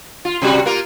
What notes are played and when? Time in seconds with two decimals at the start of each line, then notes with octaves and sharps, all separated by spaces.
0.25 F4
0.42 C3 G3 F#4
0.66 A#3 F4 A#4